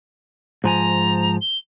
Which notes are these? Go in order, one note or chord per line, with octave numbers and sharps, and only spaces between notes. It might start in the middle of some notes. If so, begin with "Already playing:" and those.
G#2 F3 G#5 A#5
G7